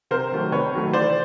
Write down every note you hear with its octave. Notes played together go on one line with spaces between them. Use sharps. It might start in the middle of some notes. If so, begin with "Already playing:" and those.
C3 A#4 C5
D#3 F#3 A3
C3 B4 C#5
D#3 F#3 A3
E3 C5 D5